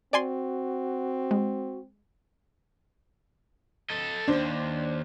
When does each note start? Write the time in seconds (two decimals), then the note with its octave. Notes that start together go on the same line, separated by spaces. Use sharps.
0.13 C4 F#4 D5 G#5 C6
1.31 G#3
3.90 A4 D#5
4.28 D#2 D4 C5